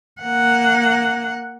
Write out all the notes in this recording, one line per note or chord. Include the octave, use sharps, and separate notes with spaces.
A#3 F#5